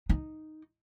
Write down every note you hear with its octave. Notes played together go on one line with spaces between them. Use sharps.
D#4